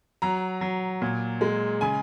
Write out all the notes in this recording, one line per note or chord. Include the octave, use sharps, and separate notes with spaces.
F#3 A#5
F#3
A#2
G#3
C#3 G#5